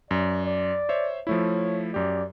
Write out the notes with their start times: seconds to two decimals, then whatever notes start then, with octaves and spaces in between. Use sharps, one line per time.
0.11 F#2 D5
0.46 D5
0.89 C5 C#5 E5
1.27 F3 A3 E4 C#5
1.94 F#2 G4 D5